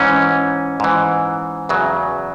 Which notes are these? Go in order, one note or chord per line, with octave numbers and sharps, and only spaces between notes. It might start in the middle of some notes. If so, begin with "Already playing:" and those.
Already playing: G#2 E3 C#4
G#2 E3
E2 C#3 F#3